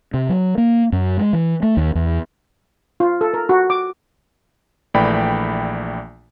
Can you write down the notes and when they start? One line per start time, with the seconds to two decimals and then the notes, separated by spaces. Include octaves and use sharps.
0.14 C3
0.29 F#3
0.58 A#3
0.92 F#2
1.18 G#3
1.33 E3
1.63 A3
1.77 D#2
1.95 E2
3.00 F4
3.21 A4
3.34 A#4
3.49 F#4
3.70 D6
4.94 A#1 E3 A3 D5 G5 B5